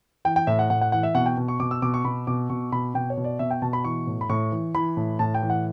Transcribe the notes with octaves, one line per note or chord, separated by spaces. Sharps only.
E3 G5
G5
A2 E5
F#5
A2 F#5
F#5
E3 F#5
E5
B2 F#5
G5
B2
C#6
B2 D6
E6
B2 D6
C#6
B2 B5
B2 D6
B2 C#6
B2 B5
B2 G5
C#5
B2
D5
B2 E5
G5
B2 A5
B5
E3 C#6
A2
B5
A2 C#6
E3
E3 B5
A2
A2 A5
G5
E3
F#5